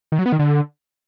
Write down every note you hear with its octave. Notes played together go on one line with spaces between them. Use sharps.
D#3
F#3
B3
D#3
D3